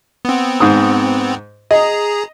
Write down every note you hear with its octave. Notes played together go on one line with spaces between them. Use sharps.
B3 C4
G#2 D#6
G#4 D#5 A#5